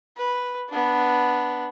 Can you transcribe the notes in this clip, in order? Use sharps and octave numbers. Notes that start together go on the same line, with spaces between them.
B4
B3 D4